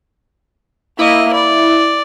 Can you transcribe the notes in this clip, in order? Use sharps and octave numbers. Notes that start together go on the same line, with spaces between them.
A#3 E4 D#5
D5